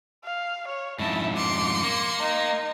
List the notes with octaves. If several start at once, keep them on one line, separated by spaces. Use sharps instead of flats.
F5
C#5
F2 G#2 E4 A5
C6 D6 C#7
A#3
D#4